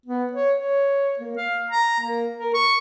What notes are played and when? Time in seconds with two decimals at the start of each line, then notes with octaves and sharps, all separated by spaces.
0.06 B3
0.33 C#5
0.59 C#5
1.19 A#3
1.37 F5
1.70 A#5
2.00 A#3
2.38 A#4
2.54 C#6